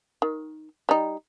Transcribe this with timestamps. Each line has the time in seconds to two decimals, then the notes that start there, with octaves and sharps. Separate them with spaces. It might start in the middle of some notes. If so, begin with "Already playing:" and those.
0.22 D#3
0.89 G3 D#4